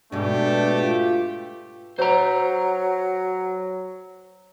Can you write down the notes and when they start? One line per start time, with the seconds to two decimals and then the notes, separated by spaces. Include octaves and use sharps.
0.12 G#2 B2 A3 D4 G4
0.80 F4
1.99 F#3 C5 A#5